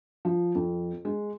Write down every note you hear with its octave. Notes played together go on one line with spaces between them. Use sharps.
F3
F2
G#3